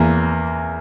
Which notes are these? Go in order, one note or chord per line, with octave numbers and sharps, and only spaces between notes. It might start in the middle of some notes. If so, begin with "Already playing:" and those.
Already playing: E2 E3 A#3